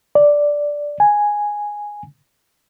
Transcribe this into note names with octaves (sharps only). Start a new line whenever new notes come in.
D5
G#5